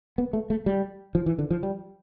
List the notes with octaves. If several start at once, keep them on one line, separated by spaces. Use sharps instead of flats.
B3
A3
A3
G3
F3
E3
D3
F3
G3